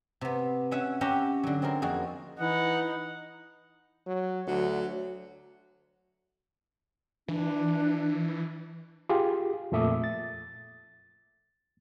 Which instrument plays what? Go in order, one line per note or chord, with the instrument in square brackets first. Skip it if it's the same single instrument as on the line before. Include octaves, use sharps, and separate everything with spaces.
[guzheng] C3 B3
C#4 C#5 E5 F#5 G#5
C#4 G4 E5 F#5 A#5
D3 F#3
C4 E4 G#4 A#4
F2 A#3 F#4 G#4
[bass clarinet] E3 [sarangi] D#4 [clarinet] E4 [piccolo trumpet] F#5
[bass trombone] F#3
[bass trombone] D2 [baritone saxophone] F#3
[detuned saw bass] E3 [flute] D4
[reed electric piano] F4 G4 G#4
F2 A#2 A3 E5 D6 D#6
A6